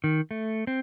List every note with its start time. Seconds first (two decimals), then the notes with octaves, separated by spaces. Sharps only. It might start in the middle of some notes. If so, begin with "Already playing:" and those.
0.04 D#3
0.31 A3
0.67 C4